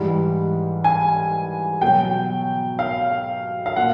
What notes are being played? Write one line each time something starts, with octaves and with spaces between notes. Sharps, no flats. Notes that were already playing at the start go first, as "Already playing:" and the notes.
Already playing: G#2 E3 G3
G#5
B2 F#3 G5
F5
F5
A#2 F#5